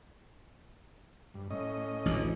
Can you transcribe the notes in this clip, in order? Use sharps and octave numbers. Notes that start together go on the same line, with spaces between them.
G2
A2 C#4 D#5
A1 D2